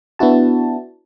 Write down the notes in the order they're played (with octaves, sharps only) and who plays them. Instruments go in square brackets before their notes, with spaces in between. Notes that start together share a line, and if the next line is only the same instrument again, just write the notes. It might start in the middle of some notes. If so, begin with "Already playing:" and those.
[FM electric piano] B3 D4 E4 F#4 A5